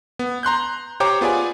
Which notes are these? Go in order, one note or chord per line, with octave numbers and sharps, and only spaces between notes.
B3
A#5 C6 F#6 G6
G4 C5 C#5 G5 A#5 D6
B3 F4 G#4 D5 G#5